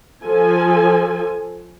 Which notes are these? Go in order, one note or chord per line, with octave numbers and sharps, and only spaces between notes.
F3 A4 G#5